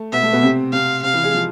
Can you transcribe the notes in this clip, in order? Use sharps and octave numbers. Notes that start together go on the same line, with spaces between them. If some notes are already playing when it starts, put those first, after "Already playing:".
Already playing: A3
B2 B3 E5
A3
B2 B3
C3 C4
C3 C4 F5
C3 C4 F5
E3 E4
G#3 G#4
F3 F4